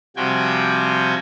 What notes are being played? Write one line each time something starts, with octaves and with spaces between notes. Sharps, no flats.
C3 F3 G3 F#4 G5 G#5